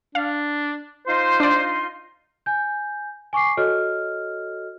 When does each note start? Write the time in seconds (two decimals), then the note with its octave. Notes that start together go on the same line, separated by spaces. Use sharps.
0.15 D4 F5
1.07 D#4 F4 C5 C6
1.40 D4 D5
2.46 G#5 G6
3.33 G#5 C#6 D6 C7
3.57 F#4 A4 C#5 D#5 F6